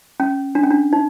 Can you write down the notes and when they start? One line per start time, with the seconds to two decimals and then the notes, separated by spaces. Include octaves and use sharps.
0.20 C#4
0.55 D4
0.63 C#4
0.71 D4
0.93 D#4